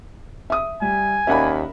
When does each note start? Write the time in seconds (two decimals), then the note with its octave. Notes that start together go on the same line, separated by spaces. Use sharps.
0.50 E5 D#6
0.81 G3 G#5
1.27 D#2 C#4 A#4 D5 E5 F#5 B5